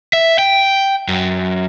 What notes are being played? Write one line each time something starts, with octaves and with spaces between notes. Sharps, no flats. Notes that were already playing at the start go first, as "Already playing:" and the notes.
E5
G5
F#2